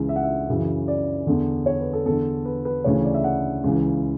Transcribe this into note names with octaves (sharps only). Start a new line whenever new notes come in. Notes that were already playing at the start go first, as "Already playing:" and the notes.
Already playing: C#2 C#3 E3
E5
F#5
E5
F#2 C#3 E3
D5
E2 D3
C#5
B4
A4
E2 D3 A4
B4
B4
D2 C#3 E3 C#5
D5
E5
F#5
C#2 C#3 E3